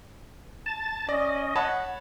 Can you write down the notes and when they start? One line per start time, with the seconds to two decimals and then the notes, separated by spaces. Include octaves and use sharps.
0.66 A5 A6
1.09 C#4 D5 D#5
1.56 C#5 F#5 A5 B5